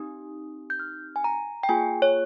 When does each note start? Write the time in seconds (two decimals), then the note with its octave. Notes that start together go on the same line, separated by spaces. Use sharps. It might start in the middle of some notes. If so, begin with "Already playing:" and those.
Already playing: C4 D#4 G4 D#6
0.70 G6
0.79 F6
1.16 G#5
1.24 A#5
1.63 G5
1.69 A#3 F4 G#4 G#5
2.02 C#5